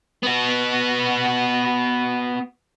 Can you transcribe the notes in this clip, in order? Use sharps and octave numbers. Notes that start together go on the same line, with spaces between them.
B3 F#4